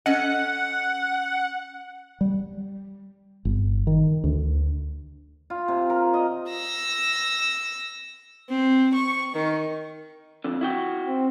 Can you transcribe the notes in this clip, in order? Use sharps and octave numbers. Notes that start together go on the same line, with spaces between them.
C#4 A4 D#5 F#5
G3
G1
D#3
D2
F4
C3
A#4
D#5
E6 A#6
C4
C#6
D#3
F2 D3
E4 F#4 G5
C4